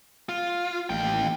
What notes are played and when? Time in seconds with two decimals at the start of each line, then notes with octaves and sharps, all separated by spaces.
0.29 F4
0.90 A1 D#2 G5